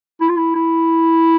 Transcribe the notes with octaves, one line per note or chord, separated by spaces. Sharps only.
E4
F4
E4
E4